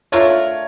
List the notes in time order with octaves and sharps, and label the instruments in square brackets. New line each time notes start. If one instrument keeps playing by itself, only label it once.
[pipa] A3 D4 F4 A#4 [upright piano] C#5